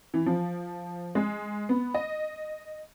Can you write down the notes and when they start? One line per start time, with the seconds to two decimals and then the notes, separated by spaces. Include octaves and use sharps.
0.14 E3
0.26 F3
1.15 G#3
1.69 B3
1.94 D#5